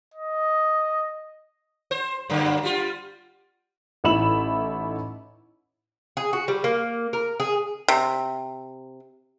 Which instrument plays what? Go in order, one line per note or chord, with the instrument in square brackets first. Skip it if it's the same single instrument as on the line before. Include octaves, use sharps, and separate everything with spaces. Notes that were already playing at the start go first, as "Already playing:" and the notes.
[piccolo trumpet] D#5
[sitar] C5
F#2 D3 A#3
G3 F4
[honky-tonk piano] A1 D#4 E4 B5 E7 F#7
[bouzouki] G#4
F#4
G3
A#3
A#4
G#4
[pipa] C3